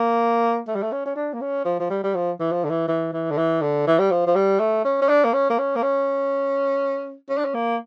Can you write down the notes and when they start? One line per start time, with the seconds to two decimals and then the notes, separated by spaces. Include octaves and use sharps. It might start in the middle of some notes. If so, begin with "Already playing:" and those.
Already playing: A#3
0.68 A3
0.75 G3
0.83 A3
0.92 C#4
1.06 C#4
1.16 D4
1.34 A#3
1.41 C#4
1.65 F3
1.80 F3
1.90 G3
2.04 G3
2.15 F3
2.40 E3
2.52 F3
2.64 D3
2.70 E3
2.88 E3
3.13 E3
3.31 D3
3.38 E3
3.62 D3
3.87 E3
3.99 G3
4.11 F3
4.27 F3
4.35 G3
4.60 A3
4.85 C#4
5.02 C#4
5.09 D4
5.25 A#3
5.34 C#4
5.50 A#3
5.59 C#4
5.76 A#3
5.83 C#4
7.30 C#4
7.38 D4
7.45 C#4
7.54 A#3